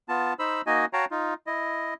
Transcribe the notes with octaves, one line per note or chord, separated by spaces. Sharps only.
B3 F4 A5
D#4 C5 B5 E6
A#3 D#4 F#4 D#5 G#5
F#4 C#5 F5 G5 A5 A#5
D#4 F4
E4 D#5